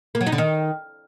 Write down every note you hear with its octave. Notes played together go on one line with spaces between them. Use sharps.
A#3
F#3
D#4
D3
D#3